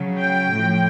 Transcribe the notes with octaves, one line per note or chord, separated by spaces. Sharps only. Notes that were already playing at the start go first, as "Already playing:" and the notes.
Already playing: C#3 F#3
G5
A2 F3